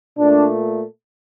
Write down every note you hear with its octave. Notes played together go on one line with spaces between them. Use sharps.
A#2 A3 D4